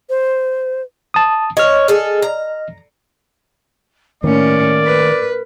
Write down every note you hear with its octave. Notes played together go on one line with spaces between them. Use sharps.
C5
A5 D#6
C#5 D#5 F6
G#4 A4
A#5
A2 D#3 A3 A#3 C#4 A#4 D5
B4